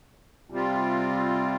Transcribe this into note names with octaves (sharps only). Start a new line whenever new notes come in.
C3 G3 C4 F4